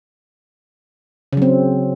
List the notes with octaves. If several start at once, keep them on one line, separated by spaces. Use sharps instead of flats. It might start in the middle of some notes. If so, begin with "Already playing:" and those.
C#3 F#3 C4